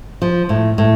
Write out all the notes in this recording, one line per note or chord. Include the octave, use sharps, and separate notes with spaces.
F3
A2
A2